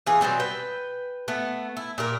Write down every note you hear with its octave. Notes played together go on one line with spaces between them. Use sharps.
E3 F4 G#4
B2 F#3 G3 C4
B4 G5
A3 B3
E4
A#2 G4 A#4